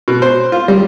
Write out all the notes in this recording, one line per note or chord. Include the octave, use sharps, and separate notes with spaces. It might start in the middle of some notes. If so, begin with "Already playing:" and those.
B2
C5
F4
G3